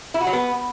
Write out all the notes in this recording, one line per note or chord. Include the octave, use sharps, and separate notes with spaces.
E4
F#4
F#3
B3